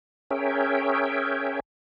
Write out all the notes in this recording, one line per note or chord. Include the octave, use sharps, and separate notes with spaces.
C#4 G#4 A#4 C#5 E5 G5